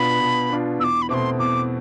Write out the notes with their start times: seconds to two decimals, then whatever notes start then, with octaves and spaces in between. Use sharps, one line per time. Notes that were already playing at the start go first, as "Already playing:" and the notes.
Already playing: B2 B3 D4 F4 B5
0.20 B2
0.50 B3 D4 F4
0.79 E2 E6
0.84 D6
1.02 B5
1.09 B2 A3 C4 C6 D6
1.39 E2 D6